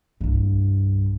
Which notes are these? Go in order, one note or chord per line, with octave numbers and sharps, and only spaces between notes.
C2 G2